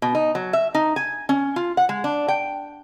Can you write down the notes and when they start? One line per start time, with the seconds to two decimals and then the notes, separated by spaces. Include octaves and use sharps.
0.02 B2
0.15 D#4
0.35 F#3
0.53 E5
0.75 D#4
0.96 G#5
1.29 C#4
1.56 F4
1.77 F#5
1.89 G#3
2.04 D4
2.28 G5